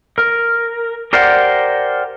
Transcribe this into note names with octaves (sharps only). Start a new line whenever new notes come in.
A#4
G4 A#4 C5 D5 F#5